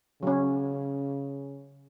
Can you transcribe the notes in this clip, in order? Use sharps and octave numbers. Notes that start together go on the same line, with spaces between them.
C#3 F#3 C#4